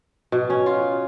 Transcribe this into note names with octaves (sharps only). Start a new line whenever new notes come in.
B2
C#4
F4